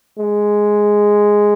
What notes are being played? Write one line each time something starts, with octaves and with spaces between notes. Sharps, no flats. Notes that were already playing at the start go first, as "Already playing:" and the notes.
G#3